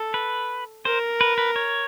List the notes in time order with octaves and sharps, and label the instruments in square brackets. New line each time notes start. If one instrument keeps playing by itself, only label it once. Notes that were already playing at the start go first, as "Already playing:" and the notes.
Already playing: [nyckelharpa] A4
[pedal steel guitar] B4
[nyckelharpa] A#4 [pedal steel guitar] C5
[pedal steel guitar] B4
B4
C#5